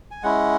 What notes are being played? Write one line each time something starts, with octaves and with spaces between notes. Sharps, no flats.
G#5
G#3 C#4 E4 F#5